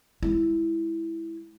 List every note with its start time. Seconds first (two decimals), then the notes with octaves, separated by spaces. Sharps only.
0.23 G#3 E4